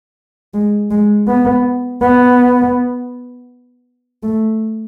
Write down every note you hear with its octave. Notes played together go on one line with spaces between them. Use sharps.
G#3
G#3
B3
B3
A3